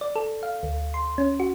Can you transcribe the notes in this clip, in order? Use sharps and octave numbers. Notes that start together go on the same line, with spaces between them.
D5
A4
F5
D2
C6
C#4
F#4